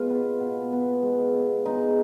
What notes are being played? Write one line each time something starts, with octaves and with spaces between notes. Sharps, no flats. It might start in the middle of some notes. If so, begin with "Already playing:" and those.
Already playing: B2 G#3 F4 B4
B3
B2
B3
G#3
B3
G#3 D#4